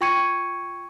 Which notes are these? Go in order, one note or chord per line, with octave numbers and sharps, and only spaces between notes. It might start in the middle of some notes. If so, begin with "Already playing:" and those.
F4 G5 C#6 G#6 C#7 D#7